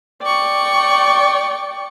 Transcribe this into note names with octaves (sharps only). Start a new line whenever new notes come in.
D5 G5 C#6